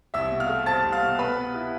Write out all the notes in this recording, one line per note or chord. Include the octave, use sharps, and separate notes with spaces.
C2 E5 E6
B2
F5 F6
A3
C4 A5 A6
C2
F5 F6
B2
B2 B4 B5
B3
E4